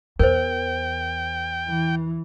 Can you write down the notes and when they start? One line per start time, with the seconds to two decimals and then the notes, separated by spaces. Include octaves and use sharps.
0.19 E2 A#4 C5 G5
1.68 E3